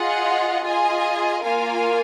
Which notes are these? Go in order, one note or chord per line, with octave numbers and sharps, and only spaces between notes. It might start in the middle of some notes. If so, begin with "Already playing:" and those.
Already playing: F4 G#4 D#5 F#5
F4 G#4 D#5 G#5
A#3 F4 A#4 F5 G#5